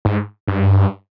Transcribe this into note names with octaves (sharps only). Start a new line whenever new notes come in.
G#2
G2